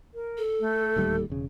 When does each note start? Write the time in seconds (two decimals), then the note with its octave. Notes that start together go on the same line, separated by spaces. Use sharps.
0.14 A#4
0.38 A4
0.60 A3
0.96 D1 D#2 G3
1.30 E1 C#3